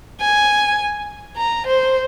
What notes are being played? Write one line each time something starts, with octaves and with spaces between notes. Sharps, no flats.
G#5
A#5
C5